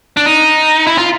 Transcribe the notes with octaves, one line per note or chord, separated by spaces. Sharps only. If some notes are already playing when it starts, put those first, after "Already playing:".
D4
D#4
E4
F4